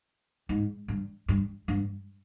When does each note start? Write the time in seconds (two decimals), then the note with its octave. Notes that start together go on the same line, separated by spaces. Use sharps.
0.49 G#2
0.88 G2
1.28 G2
1.68 G2